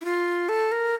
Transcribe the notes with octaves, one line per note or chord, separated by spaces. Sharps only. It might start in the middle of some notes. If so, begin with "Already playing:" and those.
E4
F4
A4
A#4